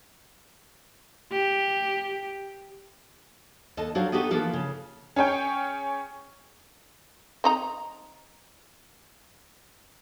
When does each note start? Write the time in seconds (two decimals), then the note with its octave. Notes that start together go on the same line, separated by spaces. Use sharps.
1.32 G4
3.77 D#2 A4 D#5 A5
3.95 F#3 D4 F#4 C5 F5
4.12 B3 D#4 F#4 G4 A4
4.30 E3 F3 A#3 A4 B4
4.53 C#3
5.16 C#4 G#4 C#5 G5
7.44 C4 D#4 A#5